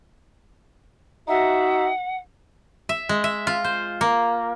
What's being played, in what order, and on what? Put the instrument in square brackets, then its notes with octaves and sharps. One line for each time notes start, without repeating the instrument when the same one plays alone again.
[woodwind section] D#4 F#4 E5 [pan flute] F#5
[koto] E5
G#3
E5
F4
C5
A#3